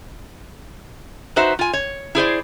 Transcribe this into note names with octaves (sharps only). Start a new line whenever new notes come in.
D#4 F#4 B4 C5 E5
F4 G#5
C#5
E4 G#4 C5 D5